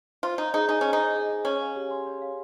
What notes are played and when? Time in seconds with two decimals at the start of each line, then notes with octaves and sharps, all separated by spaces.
0.23 F4 C5
0.38 D#4 D#5
0.54 D#4 G#4
0.69 D#4 G#5
0.81 C#4 C5
0.93 D#4
0.99 D#5
1.15 G#4
1.29 G#5
1.45 C#4 C#5
1.61 F5
1.76 G4
1.91 C6
2.06 C#5
2.22 F5